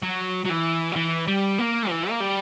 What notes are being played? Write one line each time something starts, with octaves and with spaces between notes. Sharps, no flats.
F#3
F#3
E3
F#3
E3
G3
A#3
E3
A#3
G3